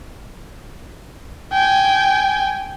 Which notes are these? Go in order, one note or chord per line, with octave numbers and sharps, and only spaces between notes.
G5 G#5